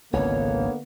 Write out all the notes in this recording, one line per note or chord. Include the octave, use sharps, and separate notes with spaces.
G#1 C#2 D3 A#3 B3 C#5